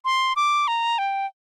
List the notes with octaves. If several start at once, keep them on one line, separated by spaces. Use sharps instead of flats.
C6
D6
A#5
G5